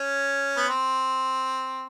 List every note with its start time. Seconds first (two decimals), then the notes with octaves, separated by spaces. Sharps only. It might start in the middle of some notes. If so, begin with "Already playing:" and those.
Already playing: C#4
0.57 B3
0.68 C4